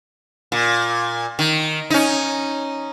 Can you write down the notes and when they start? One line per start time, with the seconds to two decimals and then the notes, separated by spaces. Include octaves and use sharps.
0.52 A#2
1.39 D#3
1.90 C#4 D#4